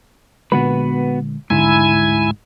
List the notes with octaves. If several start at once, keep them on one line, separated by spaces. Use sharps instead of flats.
A#2 D3 G#3 B3 F#4 B4
D1 G#1 G#2 D3 E4 G#5